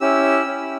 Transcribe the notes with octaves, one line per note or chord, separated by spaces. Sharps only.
C#4 E4 G4 E6
C#4 E4 G4